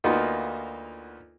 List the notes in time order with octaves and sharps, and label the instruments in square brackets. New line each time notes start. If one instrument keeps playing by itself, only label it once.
[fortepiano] D2 A#3 B3 D#4 F4 F#4